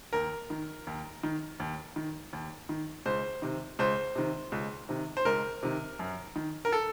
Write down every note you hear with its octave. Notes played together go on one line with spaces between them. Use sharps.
D#2 A#4
D#3
D#2
D#3
D#2
D#3
D#2
D#3
C#2 C5
C3 D#3
C#2 C5
C3 D#3
C#2
C3 D#3
C5
C#2 A#4
C3 D#3
F#2
D#3
A#4
A4